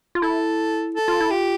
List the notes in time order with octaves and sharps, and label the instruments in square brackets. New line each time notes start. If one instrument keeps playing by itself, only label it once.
[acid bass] F4
[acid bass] E4 [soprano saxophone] A4
[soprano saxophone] A4
[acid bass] F4
E4
[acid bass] F4 [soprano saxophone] G4